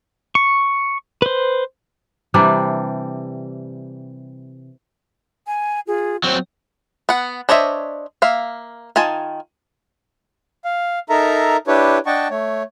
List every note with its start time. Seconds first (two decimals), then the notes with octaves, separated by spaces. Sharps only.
0.35 C#6
1.22 B4 C5
2.34 C3 E3 G3 D4
5.46 G#5
5.87 F4 G#4
6.24 F#3 C4 C5
7.09 B3 F#5
7.49 D4 C5 C#5 D#5 E5
8.22 A#3 E5 F5
8.96 D#3 F4 G#5 A5
10.65 F5
11.10 D#4 A4 A#4 E5 A#5
11.67 D4 E4 G4 B4 C#5
12.06 D4 D#5 F#5 G5 A5 C#6
12.30 A3 C#5